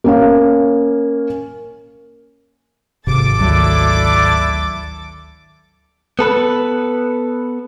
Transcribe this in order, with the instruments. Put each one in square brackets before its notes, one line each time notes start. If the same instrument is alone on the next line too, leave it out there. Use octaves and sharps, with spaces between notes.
[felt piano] A#3 C#4 F5
[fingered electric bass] G#1 [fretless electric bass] C3 [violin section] A4 D6 A6
[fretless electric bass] D2 D#3 F#3 [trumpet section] D4 E4
[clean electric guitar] B3 A4 B4